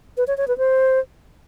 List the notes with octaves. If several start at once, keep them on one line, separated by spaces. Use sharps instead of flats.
B4
C#5
C#5
B4
C5